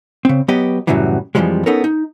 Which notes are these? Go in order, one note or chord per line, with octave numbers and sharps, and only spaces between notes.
C#3 C4
F#3 B3 G4 D#5
F#2 A2 C#3 E3 F#3 G3
F2 B2 E3 F3 G3 G#3
B3 C#4 D#4 A4 A#4
D#4